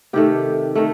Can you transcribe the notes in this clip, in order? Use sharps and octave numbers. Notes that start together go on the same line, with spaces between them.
C3 D#3 A3 G4
D#3 A3